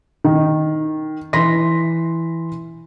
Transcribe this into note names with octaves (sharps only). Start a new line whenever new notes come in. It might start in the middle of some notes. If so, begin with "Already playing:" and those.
D#3
E3 C6 A#6 B6